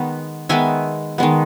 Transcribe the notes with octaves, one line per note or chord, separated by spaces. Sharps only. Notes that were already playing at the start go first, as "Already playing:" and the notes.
Already playing: D#3 G#3 B3
D#3 G#3 B3 E5 G#5
D#3 G#3 B3